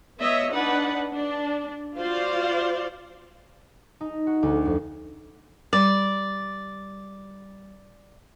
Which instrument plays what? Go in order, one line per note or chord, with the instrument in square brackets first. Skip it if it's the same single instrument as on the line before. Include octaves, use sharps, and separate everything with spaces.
[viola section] B3 C#5 D#5 E5
D4 D#4 B4 F#5
D4
F4 F#4 C5 D5 F5
[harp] D#4
F#4
D2
F2
[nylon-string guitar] G3 [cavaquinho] D5